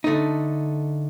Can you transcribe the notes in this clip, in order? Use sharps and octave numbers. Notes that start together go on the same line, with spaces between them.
D3 A3 D#4